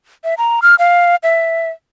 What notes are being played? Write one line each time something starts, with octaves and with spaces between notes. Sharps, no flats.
E5
A#5
F6
F5
E5